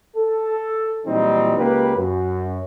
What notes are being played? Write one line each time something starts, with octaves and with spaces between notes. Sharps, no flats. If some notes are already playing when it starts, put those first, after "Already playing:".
A4
A#2 E3 F#3 G3 C4 D#4
C#2 A#3 G4 B4
F#2